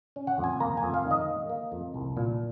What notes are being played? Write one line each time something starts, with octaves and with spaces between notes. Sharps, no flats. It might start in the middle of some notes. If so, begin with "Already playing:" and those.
C#4
F#5
F2
G#5
A#3 A#5
G#5
F2
F5
D#3
D#5
A#3
A#3
F2
C2
A#2